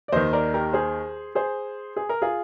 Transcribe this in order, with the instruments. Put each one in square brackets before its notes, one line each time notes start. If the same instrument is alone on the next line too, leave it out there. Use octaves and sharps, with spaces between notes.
[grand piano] D5
D#2 D#3 C5 D#5
A#4 D5
G4 A#4
G#4 C5
G#4 C5
G#4
A#4
F4 G#4